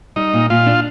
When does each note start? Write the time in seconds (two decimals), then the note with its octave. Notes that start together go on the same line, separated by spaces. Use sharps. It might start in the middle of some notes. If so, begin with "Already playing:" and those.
0.16 G3 D#4
0.33 A#2
0.50 A#2 F4
0.66 D4